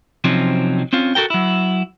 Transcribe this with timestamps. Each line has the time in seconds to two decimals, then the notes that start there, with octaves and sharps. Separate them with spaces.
0.24 C3 F3 F#3 C4 C#4 D#4
0.93 C4 C#4 F4
1.15 F#4 A4 A#4 G5
1.30 F#3 E4